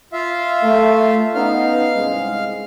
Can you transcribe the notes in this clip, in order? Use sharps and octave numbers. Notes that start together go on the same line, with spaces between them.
F4 E5 F5
A3
B3 C#4 D#4 F5 F6
C2 G#2 G#3